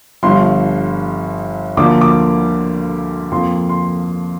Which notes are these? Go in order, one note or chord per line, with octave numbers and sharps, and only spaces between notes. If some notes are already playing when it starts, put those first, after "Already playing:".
G1 G2 F3 C6
D2 D3 F3 A#3 D6
D6
F2 F3 A#3 C6
C6